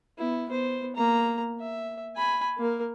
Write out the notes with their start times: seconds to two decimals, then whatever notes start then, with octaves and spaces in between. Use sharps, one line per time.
0.18 B3 E4
0.49 B3 C5
0.96 A#3 A#5
1.60 E5
2.16 G#5 B5
2.58 A#3 A#4